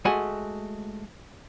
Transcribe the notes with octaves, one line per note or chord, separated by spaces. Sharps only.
G#3 A3 F#4 G#5